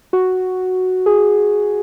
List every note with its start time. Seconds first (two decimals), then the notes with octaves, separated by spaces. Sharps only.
0.13 F#4
1.06 G#4